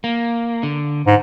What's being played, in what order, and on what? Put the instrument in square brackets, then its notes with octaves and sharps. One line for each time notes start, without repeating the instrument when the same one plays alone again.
[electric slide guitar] A#3
D3
[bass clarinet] G#2